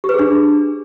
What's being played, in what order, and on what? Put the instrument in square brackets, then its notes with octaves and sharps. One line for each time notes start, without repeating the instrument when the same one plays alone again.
[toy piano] G4
B4
G#4
D4